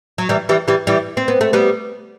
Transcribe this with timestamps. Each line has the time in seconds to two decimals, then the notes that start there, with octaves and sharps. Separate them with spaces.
0.18 F#3
0.29 E3 G3
0.49 E3 G3
0.68 E3 G3
0.87 E3 G3
1.17 C4
1.28 B3
1.41 A3
1.53 G3 B3